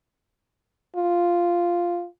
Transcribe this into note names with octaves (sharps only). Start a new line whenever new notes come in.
F4